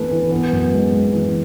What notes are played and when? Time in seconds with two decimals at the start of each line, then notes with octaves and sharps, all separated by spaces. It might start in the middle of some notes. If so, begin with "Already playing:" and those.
Already playing: E3 A3 B4
0.11 E3
0.31 B3
0.52 F#2
0.73 G#3
0.92 G#3
1.12 E3